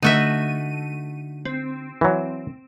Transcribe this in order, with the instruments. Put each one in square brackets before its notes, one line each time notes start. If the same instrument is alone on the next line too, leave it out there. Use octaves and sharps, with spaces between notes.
[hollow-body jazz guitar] D3 [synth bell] A3 D#7 [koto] D#4 F#4 E5
[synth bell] C4
[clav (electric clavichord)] E3 F#3